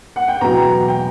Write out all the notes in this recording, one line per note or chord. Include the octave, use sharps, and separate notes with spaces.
F#5
G5
E2 B2 F#3 A#5
G5